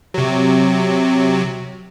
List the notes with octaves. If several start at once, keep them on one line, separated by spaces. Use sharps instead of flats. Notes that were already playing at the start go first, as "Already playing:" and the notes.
C3 F#3